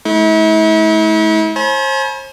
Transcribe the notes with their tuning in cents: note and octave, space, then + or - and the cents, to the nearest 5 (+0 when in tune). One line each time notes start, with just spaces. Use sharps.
A3 -40 E4 -40
C5 +40 G#5 +45 B5 -40